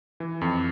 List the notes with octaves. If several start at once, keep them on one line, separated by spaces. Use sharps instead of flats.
E3
F2